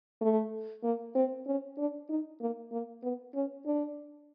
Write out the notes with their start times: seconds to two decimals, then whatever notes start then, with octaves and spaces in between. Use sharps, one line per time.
0.21 A3
0.83 A#3
1.15 C4
1.46 C#4
1.78 D4
2.09 D#4
2.40 A#3
2.72 A#3
3.03 B3
3.34 C#4
3.65 D4